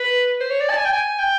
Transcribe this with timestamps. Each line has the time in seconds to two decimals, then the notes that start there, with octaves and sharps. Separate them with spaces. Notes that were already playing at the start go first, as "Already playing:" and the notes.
Already playing: B4
0.41 C5
0.50 C#5
0.60 D5
0.70 A5
0.77 G#5
0.85 G5
0.93 G#5
1.19 G5